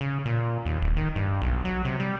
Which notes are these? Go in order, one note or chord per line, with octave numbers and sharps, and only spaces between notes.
C#3
A#2
D#2
D1
D#3
G2
B1
F#3
C3
G3